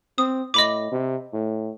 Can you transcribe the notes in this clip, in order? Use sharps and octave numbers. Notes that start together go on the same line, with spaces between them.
C4 D#6
A2 D#5 B5 D6
C3
A2